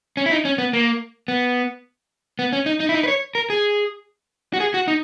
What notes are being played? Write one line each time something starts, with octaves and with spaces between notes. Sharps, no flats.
C#4
E4
D#4
C#4
B3
A#3
B3
B3
C#4
D#4
D#4
E4
D#4
B4
C#5
A#4
G#4
F#4
G#4
F#4
D#4